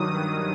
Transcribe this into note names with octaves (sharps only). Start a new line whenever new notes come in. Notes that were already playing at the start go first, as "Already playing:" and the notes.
Already playing: G2 D#3 F#3 D#6